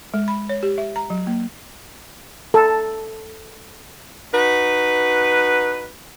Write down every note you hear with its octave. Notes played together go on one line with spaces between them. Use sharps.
G#3
B5
C#5
G4
E5
A#5
F#3
A#3
A4
D#4 F#4 B4